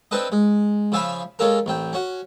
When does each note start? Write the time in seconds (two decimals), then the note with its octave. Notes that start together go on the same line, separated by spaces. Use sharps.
0.11 C4 D4 A4 B4 D#5
0.32 G#3
0.92 C#3 F3 E5 F5 G#5 B5
1.39 G#3 C#4 F4 A4 A#4
1.66 A1 C4 G5
1.93 C#4 F#4